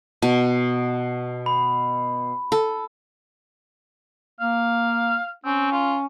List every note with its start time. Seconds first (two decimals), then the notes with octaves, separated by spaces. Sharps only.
0.22 B2 A5
1.46 B5
2.52 A4 A5
4.40 A#3 F5
5.45 C4 C#4
5.72 F4